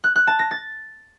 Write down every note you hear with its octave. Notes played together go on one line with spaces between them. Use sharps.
F#6
F#6
A5
A#6
A6